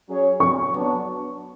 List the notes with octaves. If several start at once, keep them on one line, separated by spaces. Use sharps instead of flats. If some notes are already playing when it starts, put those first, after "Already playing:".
F#3 C#4 G#4 C#5
C#6
F#3 B3 D4